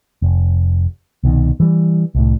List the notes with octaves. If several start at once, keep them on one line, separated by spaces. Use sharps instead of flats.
F1
C2 B2 D#3
E3 G3
C2 A2